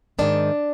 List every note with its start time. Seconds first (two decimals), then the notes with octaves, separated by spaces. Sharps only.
0.19 G#2 D#3 D4